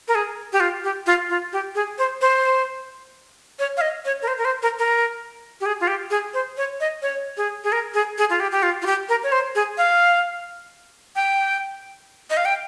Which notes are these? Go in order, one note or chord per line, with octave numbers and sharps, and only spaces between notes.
A#4
G#4
G4
F4
G4
F4
F4
G4
G#4
C5
C5
C#5
F5
D#5
C#5
A#4
C5
A#4
C5
A#4
A#4
G4
G#4
F4
G4
G#4
C5
C#5
D#5
C#5
G#4
G#4
A#4
G#4
G#4
F4
G4
G4
F4
F4
G4
A#4
C#5
C5
G#4
F5
G5
D#5
F5
G5